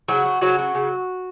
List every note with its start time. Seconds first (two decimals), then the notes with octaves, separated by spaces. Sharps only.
0.08 C#3 F#3 F#4
0.26 F#3
0.41 C#3 F#3 F#4
0.59 F#3
0.75 C#3